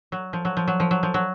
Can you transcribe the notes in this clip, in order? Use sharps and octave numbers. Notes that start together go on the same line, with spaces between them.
F#3
F3
F#3
F3
F#3
F3
F#3
F3
F#3